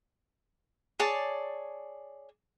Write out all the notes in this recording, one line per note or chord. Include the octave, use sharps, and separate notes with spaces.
G#4 C#5 D5 A5